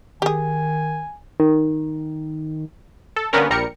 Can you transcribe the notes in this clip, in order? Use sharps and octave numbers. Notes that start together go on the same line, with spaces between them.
D#3 G4 G#4 G#5
D#3
A4
D3 G3 A#3 B3 C#4 A#4
A#1 G3 A#4 C#7